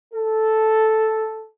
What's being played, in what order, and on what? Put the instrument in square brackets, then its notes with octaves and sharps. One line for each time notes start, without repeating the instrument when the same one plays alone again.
[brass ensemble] A4